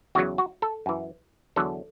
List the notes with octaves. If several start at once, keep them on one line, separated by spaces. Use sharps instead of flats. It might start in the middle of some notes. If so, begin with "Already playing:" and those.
E2 C#3 F#3 F#4
F#4
A4
F#2 E3
E2 D3 F#3 A4